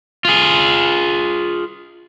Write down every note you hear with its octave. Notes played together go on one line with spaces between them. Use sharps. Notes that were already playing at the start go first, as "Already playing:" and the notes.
F4 G#4